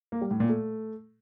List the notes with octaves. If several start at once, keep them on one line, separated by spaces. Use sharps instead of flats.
A#3
G3
A2
A#2
A3